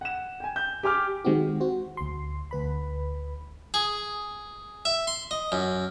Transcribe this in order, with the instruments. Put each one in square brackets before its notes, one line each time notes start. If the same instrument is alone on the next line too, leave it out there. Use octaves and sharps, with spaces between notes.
[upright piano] F#5 E7
G5 G#5
G6
G4 G#5 D6 F6
[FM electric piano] D#3 G#3 C4 D#4 F#4 G4
F#4 C5
D2 C6
D2 B4 B5
[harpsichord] G#4
E5
C6
D#5
F#2